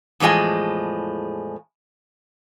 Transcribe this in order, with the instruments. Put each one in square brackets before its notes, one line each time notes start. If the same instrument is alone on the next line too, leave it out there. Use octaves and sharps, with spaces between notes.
[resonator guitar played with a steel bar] E2 A2 F3 G#3 G#5